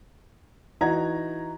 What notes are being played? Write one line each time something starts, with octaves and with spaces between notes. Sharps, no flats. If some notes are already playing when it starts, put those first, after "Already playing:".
E3 D#4 F#4 A#5 G#6